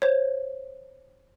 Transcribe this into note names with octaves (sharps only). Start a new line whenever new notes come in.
C5 C#5